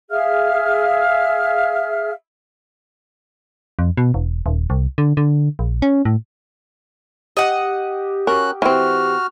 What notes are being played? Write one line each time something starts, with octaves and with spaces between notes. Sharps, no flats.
G#4 E5 F5 F6
F2
B2
E1
D#1
C2
D3
D3
A#1
C#4
A2
G4 D#5 F#5
C#4 F#4 A#4 F#6
E3 C4 F#4 F6